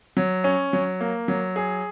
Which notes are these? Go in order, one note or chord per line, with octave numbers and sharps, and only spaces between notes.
F#3
C#4
F#3
A#3
F#3
G#4